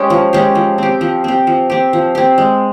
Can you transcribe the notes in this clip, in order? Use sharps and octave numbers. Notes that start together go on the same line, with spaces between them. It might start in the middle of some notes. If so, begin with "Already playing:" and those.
Already playing: G#3 C#4 G4
F3
G#3 C#4 G4
F3
C4 G4
F3
C4 G4
F3
C4 G4
F3
C4 G4
G#3